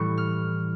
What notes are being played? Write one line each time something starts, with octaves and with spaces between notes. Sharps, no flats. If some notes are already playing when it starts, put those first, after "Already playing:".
Already playing: A2 E3 G3 C#6
F6